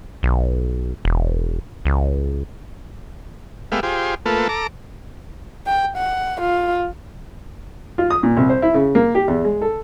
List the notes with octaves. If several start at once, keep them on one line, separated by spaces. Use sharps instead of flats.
B1
E1
C#2
G#3 A3 B3 G4 E5 F5
F4 G4 G#4 C5
A3 A#3 F4 A4 B4
A4 A#5 D6
G5
F#5
F4
F4
D#6
A#2
C2
C5
E4
C#3
A#3
G4
E2
G#3
A4